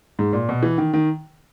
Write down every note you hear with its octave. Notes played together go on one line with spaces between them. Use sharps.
G#2
A#2
B2
E3
D#3
D#3